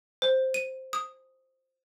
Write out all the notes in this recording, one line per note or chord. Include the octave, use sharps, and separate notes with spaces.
C5
D#7
D#6